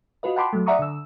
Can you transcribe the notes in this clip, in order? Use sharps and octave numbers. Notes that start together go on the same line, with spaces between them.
F4 F#4 B4 D#5
F#5 G5 A5 B5 C6 D6
F#3 A3
D5 E5 F#5 A#5 C#6 D#6
D3 E6